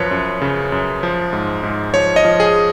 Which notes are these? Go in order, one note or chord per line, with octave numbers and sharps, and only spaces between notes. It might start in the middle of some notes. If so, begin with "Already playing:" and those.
Already playing: F#2 F3 B4 C#5
F#2
C#3
F#2
F3
G#2
G#2
F3 C#5
D#5
F3
G#4